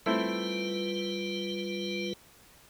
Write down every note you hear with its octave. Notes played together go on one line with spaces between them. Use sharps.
G3 A3 C4 E4 F4 B4